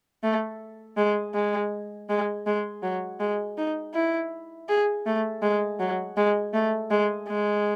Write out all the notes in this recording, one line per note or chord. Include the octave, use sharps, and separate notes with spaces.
A3
G#3
G#3
G#3
G#3
F#3
G#3
D#4
E4
G#4
A3
G#3
F#3
G#3
A3
G#3
G#3